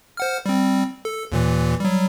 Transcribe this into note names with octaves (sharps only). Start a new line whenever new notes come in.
C5 F#5 F6
G3 C4
A4
D#2 A#2 E3
F#3 G3